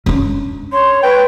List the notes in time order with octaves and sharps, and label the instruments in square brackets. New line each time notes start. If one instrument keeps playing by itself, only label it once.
[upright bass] C#4 D4
[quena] C#5 [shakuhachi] C6
[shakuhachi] B4 [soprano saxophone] G5